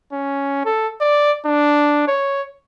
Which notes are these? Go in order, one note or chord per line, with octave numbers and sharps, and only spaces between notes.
C#4
A4
D5
D4
C#5